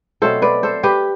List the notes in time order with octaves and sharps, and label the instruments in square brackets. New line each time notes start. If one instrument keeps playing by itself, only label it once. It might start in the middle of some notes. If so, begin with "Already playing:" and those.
[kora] B2 F#3 A3 C4 A4 C5
B4 D5
A4 C5
G4 B4